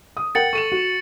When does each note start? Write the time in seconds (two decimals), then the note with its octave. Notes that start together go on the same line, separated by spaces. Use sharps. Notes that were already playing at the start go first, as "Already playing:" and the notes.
0.17 D#6
0.35 A#4 F#5 G5 A6 C#7 F#7
0.53 A4 C#6 D#7 E7
0.72 F#4